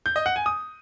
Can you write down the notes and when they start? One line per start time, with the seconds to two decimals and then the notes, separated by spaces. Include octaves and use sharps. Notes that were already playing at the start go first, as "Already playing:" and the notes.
0.06 G6
0.16 D#5
0.26 F#5
0.36 G#5
0.46 D#6